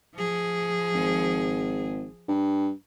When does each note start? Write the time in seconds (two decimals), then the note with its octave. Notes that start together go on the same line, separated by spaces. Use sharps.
0.14 F3 G#4
0.94 G#1
2.28 G2